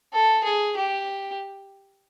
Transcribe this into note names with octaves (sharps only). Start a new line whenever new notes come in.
A4
G#4
G4